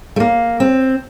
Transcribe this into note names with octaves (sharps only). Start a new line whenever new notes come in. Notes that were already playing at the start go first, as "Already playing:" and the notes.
A3
A#3
C4